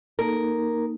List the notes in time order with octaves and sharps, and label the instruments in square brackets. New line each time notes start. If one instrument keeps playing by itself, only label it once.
[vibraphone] A#3 D#4 [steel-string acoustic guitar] A#4